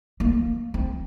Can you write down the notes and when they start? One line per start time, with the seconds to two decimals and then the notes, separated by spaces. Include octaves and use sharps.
0.20 A#3
0.74 C4